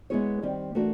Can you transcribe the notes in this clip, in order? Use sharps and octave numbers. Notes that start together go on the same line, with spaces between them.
G#3 B3 E4 G#4 C#5
D#3 G3 C4
E3 A3 D4 F#4 A#4